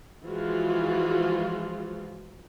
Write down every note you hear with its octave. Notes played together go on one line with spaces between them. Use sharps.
E3 F3 G#3 F4 F#4